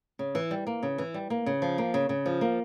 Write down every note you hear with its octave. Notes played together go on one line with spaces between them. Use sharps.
C#3
E3
G3
A#3
C#3
E3
G3
A#3
C#3
F3
A#3
C#3
C#3
F3
A#3